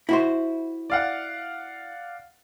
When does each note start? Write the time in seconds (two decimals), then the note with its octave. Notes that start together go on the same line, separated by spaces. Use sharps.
0.09 E4 F#4 C5
0.90 D5 F5 F#5